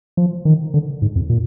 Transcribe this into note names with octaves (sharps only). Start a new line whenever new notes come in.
F3
D#3
D3
G#2
F2
A#2